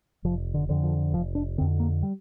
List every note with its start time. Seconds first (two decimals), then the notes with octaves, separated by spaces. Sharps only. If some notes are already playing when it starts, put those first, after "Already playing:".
0.25 F1 F3
0.54 D3
0.69 F2 D3
0.83 F3
1.13 F1 F3
1.35 D4
1.58 D3 C4
1.61 F2
1.80 A#3
2.03 G3